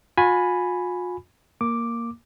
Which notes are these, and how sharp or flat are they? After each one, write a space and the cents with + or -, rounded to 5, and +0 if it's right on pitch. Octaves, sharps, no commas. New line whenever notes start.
F4 +45 G#5 +0 B5 +0
A#3 +0 D6 +0